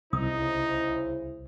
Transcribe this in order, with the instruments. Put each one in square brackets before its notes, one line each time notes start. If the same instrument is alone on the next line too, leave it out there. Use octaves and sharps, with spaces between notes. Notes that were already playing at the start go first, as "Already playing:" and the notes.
[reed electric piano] C2 [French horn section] C#3 E4 C5 [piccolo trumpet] D#4 [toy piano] D#6